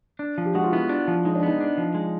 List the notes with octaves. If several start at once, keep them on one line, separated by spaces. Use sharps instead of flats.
D4
F3
G4
G#3 F#4
F4
B3 E4
D4
F3
G#3 D#4
D4
B3 D#4
D4
F3
G#3